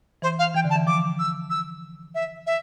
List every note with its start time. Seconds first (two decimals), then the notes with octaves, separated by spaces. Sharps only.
0.22 E3 C5
0.39 F5
0.54 E3 G5
0.64 D3
0.70 A5
0.76 E3
0.87 F3 D6
1.19 E6
1.50 E6
2.15 E5
2.47 E5